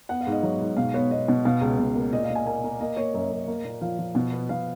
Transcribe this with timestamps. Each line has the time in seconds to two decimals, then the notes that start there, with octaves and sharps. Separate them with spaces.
0.09 B3 F#5
0.21 F5
0.27 G#2
0.32 D#5
0.43 F#3 C#5
0.61 G#2
0.77 B2 F5
0.94 B3 C#5
1.11 B3 D#5
1.28 B2
1.45 B2 F5
1.61 C#2
1.79 B2
1.95 A#3
2.13 A#2 D#5
2.24 F5
2.30 A#2
2.35 G#5
2.46 A#3 G#5
2.64 A#3
2.80 A#3 D#5
2.97 A#3 C#5
3.13 F#2 D#5
3.31 F#2
3.47 A#3
3.64 A#2
3.81 F3 F5
3.99 F3
4.15 B2
4.33 B3
4.49 B2 F5